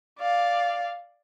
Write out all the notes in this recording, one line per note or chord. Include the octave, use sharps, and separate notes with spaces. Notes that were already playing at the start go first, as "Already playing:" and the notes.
D5 F5